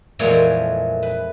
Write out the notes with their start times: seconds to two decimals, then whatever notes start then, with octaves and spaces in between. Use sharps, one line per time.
0.19 F2 A#2 E3 G#3 A3 C#5
1.03 B4